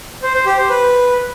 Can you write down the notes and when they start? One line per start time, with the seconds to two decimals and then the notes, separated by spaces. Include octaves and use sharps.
0.23 C5
0.34 C5
0.46 G4
0.57 C5
0.69 B4